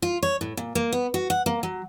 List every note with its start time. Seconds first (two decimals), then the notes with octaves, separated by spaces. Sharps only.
0.02 F4
0.23 C#5
0.41 A2
0.57 A#2
0.75 A#3
0.92 B3
1.14 F#4
1.30 F#5
1.46 A#3
1.63 F#3